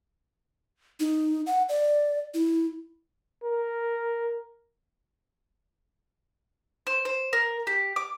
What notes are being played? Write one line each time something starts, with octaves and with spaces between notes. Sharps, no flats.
D#4
F#5
D5
E4
A#4
C5
C5
A#4
G4
D6